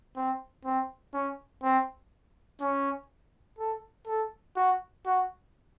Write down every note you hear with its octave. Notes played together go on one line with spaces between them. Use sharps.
C4
C4
C#4
C4
C#4
A4
A4
F#4
F#4